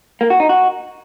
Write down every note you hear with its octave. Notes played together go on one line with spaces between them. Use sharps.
A#3
F#4
D#4
F#4